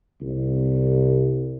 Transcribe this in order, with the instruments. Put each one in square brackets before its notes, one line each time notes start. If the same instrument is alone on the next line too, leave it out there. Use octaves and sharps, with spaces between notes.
[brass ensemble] C2